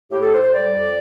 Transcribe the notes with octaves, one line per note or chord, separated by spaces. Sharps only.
A2 G4
A4
A2 C5
C5
G3 D5
F2